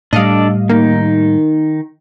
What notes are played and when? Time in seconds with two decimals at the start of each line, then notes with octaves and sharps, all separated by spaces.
0.13 A2 G3 D4 A4 D5 D#5 F5
0.69 D#3 A#3 D#4